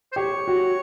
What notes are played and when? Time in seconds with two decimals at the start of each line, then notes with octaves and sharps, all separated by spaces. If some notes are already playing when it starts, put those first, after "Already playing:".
0.12 C5
0.16 G4 C#5
0.48 F#4